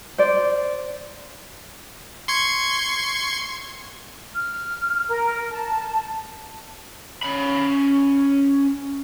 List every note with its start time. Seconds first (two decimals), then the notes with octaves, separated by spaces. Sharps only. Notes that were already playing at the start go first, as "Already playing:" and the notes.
0.18 C5 D5
2.28 C6 C#6 G#6
4.34 F6
5.09 A#4
5.51 A5
7.23 C#4 B5